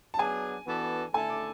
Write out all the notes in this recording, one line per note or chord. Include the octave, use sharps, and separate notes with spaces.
A5
F#3 B3 D4 G#4 G#5
E3 B3 D4 F#4 A4
D3 A3 E4 A4 G#5
D6